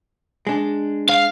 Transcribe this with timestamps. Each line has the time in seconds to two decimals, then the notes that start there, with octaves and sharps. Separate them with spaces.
0.47 G#3 D4
1.09 F5